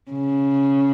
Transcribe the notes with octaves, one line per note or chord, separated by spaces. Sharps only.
C#3